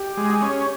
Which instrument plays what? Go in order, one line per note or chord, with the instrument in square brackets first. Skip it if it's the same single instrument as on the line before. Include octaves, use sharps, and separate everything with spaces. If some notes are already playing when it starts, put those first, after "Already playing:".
Already playing: [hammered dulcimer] G4
[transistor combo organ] G#3
[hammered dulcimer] G#4
[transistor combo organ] C#4